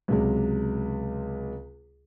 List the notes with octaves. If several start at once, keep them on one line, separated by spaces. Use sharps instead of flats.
C#2 C3 F#3 G#3